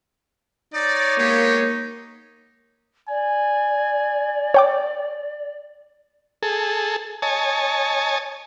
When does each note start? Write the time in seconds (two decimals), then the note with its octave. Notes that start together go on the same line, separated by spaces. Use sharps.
0.74 D#4 C#5 D5
1.18 G#3 A#3 B3 G4
3.09 D5 G#5
4.54 C#5 G5 D6
6.43 G#4 A4
7.22 C#5 D#5 G#5 A5